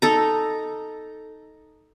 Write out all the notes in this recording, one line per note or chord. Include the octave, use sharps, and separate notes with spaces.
D#4 A4 A#5